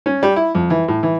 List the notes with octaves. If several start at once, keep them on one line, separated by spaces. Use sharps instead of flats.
C#4
G3
E4
F2
E3
A2
E3